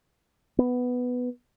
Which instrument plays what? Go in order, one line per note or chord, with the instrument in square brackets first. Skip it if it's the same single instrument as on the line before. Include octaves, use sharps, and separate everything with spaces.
[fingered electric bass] B3